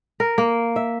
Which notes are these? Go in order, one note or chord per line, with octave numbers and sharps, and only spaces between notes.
A#4
A#3
E5